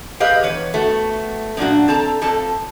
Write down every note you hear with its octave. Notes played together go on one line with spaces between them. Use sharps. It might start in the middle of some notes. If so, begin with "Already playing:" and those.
G4 G#4 B4 D#5 F5
E2 B4 C#5
A3 B3 F#4
F#2 A#2 D4 F#4
C4 A4 A5 A#5
F2 F3 A4 A5